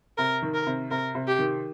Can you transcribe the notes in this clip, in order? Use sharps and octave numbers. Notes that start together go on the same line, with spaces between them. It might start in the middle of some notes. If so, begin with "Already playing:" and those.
C3 A#4
D#3
A#4
C3
C3 A#4
C3
G4
D#3